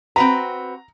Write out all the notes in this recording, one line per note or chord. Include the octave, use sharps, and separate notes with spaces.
C4 F#4 B4 A#5